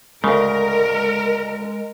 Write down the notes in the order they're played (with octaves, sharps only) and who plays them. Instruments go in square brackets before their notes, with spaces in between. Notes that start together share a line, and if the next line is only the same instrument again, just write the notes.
[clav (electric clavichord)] D2 C#3 [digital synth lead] G#3 [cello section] A#4